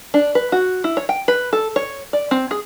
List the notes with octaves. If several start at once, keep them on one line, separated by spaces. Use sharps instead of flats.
D4
B4
F#4
E4
C#5
G5
B4
A4
C#5
D5
C4
G#4